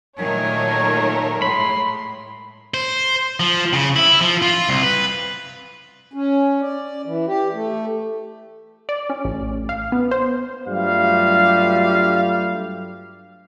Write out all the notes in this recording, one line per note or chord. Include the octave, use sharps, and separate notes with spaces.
A#2 D#3 F#3 A3 A#4 C#5 G#5
A2 G#3 B5 C6
C5
F3
C#3
E4
F3
F4
C2
B4
C#4
D5
E3
G4
A3
D5
C#4
A1
F5
B3
C5
G2 F#3 G3 A3 F4 F5